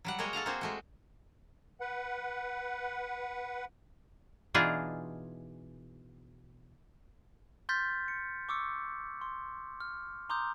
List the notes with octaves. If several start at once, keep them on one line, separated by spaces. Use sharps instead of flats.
F#3 G3 F#5
G#3 A#3 F#4 A#4 C#5 D#5
A4 F5 F#5 A#5
A#3 C4 F#4 G#4 C5
G#3 A3 F#4
B4 F#5
B2 E3 D4 D#4 F4 G#4
C6 F6 G6 A6 B6
C#7
C#6 D6 E6 C#7
C6
F6
A#5 C6 D6 D#6 G6